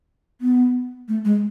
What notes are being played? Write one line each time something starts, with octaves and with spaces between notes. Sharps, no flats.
B3
A3
G#3